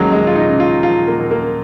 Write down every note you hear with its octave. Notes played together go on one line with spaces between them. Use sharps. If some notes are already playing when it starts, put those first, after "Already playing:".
Already playing: D#2 F3 F#3 G#3 A#3 C#4
D#2 G#3
F4
D#4
C#3
F4
F3 F4
A#3
D#2
A#3